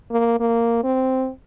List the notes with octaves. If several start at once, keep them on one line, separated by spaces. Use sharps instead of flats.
A#3
A#3
C4